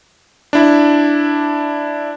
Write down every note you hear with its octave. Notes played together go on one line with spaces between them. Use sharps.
D4 E4